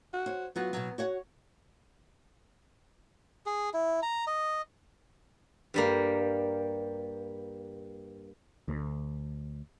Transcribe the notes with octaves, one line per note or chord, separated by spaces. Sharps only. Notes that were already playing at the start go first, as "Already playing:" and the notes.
F#4
C5 C#5
F#3 B3 F4 F#4
B2 F#3
F#4 C#5 F#5
G#4
E4
A#5
D#5
G2 G3 A#3
D2